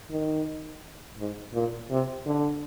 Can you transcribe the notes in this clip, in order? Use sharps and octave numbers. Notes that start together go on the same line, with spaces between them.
D#3
G#2
A#2
C3
D3